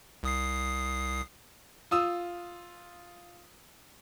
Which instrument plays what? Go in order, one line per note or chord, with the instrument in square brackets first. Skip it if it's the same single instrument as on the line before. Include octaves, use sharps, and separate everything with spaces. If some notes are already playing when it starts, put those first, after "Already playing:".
[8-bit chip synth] C2 D#6 C7
[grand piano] F4 D#6 E6